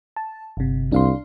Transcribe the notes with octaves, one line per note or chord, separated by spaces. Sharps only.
A5
G1 C3
C2 D4 F5 C6